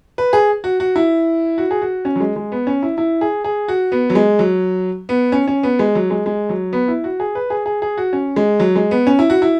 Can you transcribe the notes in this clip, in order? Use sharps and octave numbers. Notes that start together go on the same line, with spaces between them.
B4
G#4
F#4
F#4
E4
F#4
G#4
F#4
C#4
F#3
G#3
G#3
B3
C#4
E4
E4
G#4
G#4
F#4
B3
F#3
G#3
F#3
B3
C#4
C#4
B3
G#3
F#3
G#3
G#3
F#3
B3
E4
F#4
G#4
B4
G#4
G#4
G#4
F#4
C#4
G#3
F#3
G#3
B3
C#4
E4
F#4
E4